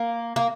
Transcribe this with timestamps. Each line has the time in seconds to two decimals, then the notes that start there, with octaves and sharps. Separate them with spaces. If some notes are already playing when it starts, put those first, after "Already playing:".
Already playing: A#3
0.36 A#3